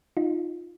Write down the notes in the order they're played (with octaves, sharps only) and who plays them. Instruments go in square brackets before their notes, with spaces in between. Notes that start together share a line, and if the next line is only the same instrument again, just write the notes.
[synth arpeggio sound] D#4 F4